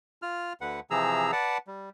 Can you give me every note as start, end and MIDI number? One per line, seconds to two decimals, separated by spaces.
0.22 0.53 65
0.22 0.53 89
0.61 0.80 38
0.61 0.80 50
0.61 0.80 71
0.61 0.80 78
0.91 1.31 48
0.91 1.31 52
0.91 1.31 53
0.91 1.31 68
0.91 1.31 82
0.91 1.31 88
1.32 1.58 71
1.32 1.58 74
1.32 1.58 78
1.32 1.58 81
1.67 1.90 55